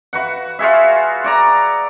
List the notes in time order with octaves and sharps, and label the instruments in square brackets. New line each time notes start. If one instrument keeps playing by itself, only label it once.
[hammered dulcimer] F#4 B4 F#5
F4 F#4 G#4 E5
F#4 D5 A#5